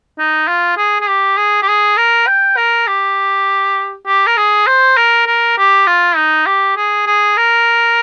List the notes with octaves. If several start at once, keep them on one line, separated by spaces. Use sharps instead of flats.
D#4
F4
G#4
G#4
G4
G#4
G4
G#4
A#4
G5
A#4
G4
G4
A#4
G#4
C5
A#4
A#4
G4
F4
D#4
G4
G#4
G#4
A#4